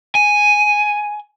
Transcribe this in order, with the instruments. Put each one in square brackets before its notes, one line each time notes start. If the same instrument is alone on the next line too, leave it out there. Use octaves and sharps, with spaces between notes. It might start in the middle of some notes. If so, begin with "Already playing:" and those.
[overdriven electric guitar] G#5